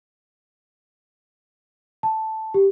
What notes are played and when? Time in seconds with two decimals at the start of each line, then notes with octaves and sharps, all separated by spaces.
2.03 A5
2.54 G4